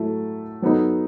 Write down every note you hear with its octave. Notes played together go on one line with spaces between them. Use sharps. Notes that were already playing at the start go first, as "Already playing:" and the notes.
Already playing: A2 F#3 A3 E4 A4
F#3 B3 D#4 A4